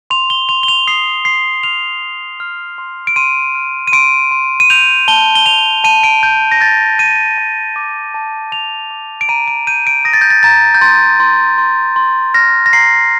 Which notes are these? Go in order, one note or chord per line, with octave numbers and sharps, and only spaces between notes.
C6 F7
G7
C6 F7
G7
F7
D#6 C7
C6 C7
F6 F7
C6
F6
C6
D7
C6 D#7
F6
D#7
C6 D7
C6
D#7
G6 F7
A5 G7
G7
A5 F7
A5 D#7
D7
G6
A#6
G6 A6
G6 D#7
A5
D6
A5
A5 F7
D6
D7
A#5 D#7
D7
G6 D#7
D7
D#6 A#6
A6
G6
A6
A#5 A6
G6
C6 A6
C6
C6
C6
F6 A#6
A#6
A#5 C7